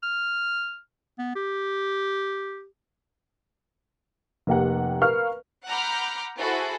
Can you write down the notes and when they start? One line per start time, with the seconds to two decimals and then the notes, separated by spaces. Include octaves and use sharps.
0.03 F6
1.19 B3
1.35 G4
4.47 F1 A#3 G4 F#5
5.01 A#4 B4 F5 C#6 F6
5.66 F#5 A#5 B5 D6 F6 G6
6.37 E4 F#4 G#4 A4 C5